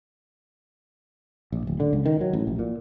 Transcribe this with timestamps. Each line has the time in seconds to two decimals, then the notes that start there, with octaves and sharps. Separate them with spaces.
1.52 A#1
1.67 D1
1.80 D3
1.93 C#2
2.06 D#3
2.21 F#3
2.33 A1
2.47 A#1
2.59 A#2